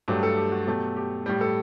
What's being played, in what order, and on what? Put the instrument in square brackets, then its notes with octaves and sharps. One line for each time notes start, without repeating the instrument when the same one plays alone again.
[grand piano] G2 F#3 A3 G4
A4
G4
F#4
B2 F#3 A3 G4
G4
A2 G3 G4
A4